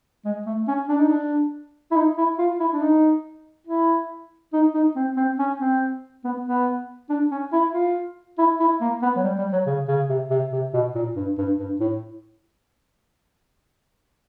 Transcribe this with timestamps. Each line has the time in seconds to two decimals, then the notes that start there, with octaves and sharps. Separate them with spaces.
0.25 G#3
0.46 A3
0.68 C#4
0.89 D4
0.98 D#4
1.08 D4
1.91 E4
1.96 D#4
2.17 E4
2.39 F4
2.60 E4
2.73 D4
2.81 D#4
3.67 E4
4.53 D#4
4.74 D#4
4.96 C4
5.17 C4
5.39 C#4
5.60 C4
6.24 B3
6.45 B3
7.10 D4
7.31 C#4
7.52 E4
7.74 F4
8.38 E4
8.60 E4
8.81 A#3
9.02 B3
9.16 F#3
9.24 G3
9.38 G3
9.53 F#3
9.66 C#3
9.88 C#3
10.09 C3
10.31 C3
10.53 C3
10.74 B2
10.95 A#2
11.16 G2
11.38 G2
11.59 G2
11.80 A2